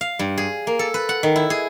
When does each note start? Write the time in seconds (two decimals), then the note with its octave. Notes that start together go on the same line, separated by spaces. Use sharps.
0.01 F5
0.19 G2
0.38 G#4
0.67 A#3
0.79 A4
0.94 B4
1.09 F#5
1.23 D#3
1.36 E4
1.50 G#4